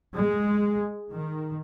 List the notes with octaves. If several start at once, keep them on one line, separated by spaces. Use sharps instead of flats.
G#3
D#3